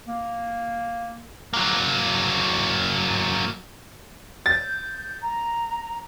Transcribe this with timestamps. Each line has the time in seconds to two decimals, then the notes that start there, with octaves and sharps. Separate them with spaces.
0.07 A#3
1.53 F#3 A#3
4.46 G6 A6
5.21 A#5